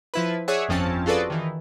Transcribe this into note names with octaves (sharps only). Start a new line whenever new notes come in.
F3 E4 B4
G#4 C#5 D5 E5 F#5 G#5
G1 F2 F3 C4 C#4 A5
F4 F#4 G#4 A4 B4 D5
D#3 E3